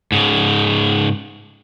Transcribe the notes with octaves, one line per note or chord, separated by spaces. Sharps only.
G#2 C#3